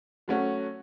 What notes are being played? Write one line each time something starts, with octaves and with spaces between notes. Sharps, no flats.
F#3 A3 C#4 F#4